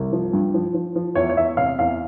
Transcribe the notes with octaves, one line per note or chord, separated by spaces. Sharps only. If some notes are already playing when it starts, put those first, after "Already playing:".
Already playing: C2
F3
G2
F3
F3
F3
E2 C#5
C#5
E2 E5
C3 F5
E2 F5